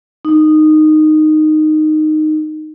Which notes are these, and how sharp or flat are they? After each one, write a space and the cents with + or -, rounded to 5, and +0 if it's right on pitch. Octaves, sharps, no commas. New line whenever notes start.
D#4 -10